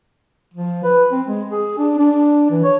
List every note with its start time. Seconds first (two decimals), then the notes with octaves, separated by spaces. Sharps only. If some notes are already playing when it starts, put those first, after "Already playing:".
0.54 F3
0.84 B4
1.12 C4
1.27 G#3
1.51 G#4
1.78 D4
1.98 D4
2.50 E3
2.64 C#5